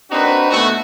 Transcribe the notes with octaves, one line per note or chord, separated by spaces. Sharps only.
A#3 C4 D4 D#4 F#4 B4
B2 A3 F#4